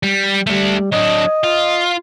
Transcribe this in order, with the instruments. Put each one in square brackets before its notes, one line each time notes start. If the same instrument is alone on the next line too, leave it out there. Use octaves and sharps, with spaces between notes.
[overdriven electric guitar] G3
[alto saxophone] G3 [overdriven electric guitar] A3 D4
[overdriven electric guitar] F#3 D4 [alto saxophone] D#5
[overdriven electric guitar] F4